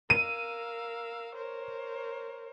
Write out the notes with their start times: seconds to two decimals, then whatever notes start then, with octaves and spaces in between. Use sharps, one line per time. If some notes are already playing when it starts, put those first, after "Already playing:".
0.10 A#4 F5 E6 D#7
1.35 A#4 C5 C#5